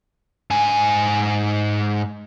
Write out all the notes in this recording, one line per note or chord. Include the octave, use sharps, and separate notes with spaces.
G#2 G#5